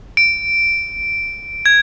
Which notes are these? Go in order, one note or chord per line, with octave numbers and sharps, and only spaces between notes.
D7
G#6